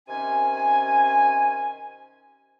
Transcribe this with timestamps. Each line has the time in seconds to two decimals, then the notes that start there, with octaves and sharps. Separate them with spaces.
0.08 C3 D#3 C#4 G#5